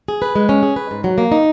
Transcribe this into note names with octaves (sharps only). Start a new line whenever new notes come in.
G#4
B4
G#3
C#4
G#4
B4
G#2
F#3
A#3
D#4